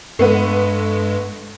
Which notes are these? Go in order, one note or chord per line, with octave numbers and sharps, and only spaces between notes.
G2 G#3 A3 B3 B4